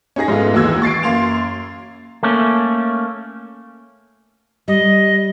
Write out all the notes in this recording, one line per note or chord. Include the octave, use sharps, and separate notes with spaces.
C#4 D#4 G#4 A#6
G#2 G#3 A3 B3 F4
A1 D#2 E3 F#4 E6 G#6
C#6 A6 C7 D7
F#2 A#3 C6 F7
A3 A#3 C#4
G3 D#5